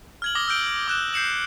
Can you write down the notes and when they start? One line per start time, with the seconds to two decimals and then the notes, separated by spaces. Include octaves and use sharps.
0.22 F6 G#6 F#7
0.35 D6 D#6 A#6 G7
0.48 E6 F6 G6 D7 G7
0.88 D6 F#6 E7
1.13 G6 C7 C#7 E7 F#7